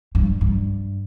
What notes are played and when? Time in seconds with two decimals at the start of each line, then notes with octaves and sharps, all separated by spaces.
0.15 G2
0.41 G2